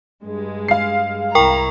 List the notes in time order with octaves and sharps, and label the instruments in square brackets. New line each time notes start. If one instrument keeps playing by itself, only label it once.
[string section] G2 G#3
[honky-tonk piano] F5 C7
[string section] C2 E4 A#5 [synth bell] A#4 G5 C#6